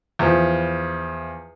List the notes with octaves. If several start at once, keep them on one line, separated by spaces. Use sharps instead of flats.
E2 F3